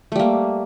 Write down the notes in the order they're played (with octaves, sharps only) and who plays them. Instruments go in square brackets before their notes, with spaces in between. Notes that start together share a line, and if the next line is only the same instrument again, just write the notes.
[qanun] A3
G3
A#3